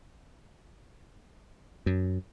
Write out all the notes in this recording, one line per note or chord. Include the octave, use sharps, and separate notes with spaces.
F#2